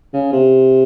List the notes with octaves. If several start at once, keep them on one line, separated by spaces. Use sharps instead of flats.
C#3
C3